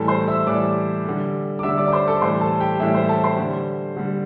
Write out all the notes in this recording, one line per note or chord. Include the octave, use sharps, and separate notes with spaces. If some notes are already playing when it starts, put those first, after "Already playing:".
Already playing: A2 E3 G3 A4 A5
C5 C6
E5 E6
A2 E3 G3 D5 D6
D3 G3
D6
D3 G3 E5 E6
D5 D6
D6
C5 C6
A4 A5
A2 E3 G3 C5 C6
A4 A5
G4 G5
A2 E3 G3 E4 E5
C5
A4 A5
C5 C6
D3 G3
D3 G3